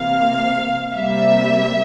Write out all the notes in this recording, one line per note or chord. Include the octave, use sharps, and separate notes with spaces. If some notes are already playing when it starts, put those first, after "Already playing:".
Already playing: C3 E3 A#3 F5
C3 G3 A#3 E5